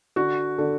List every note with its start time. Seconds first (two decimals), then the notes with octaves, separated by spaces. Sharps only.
0.16 D3 F#4
0.58 D3 A4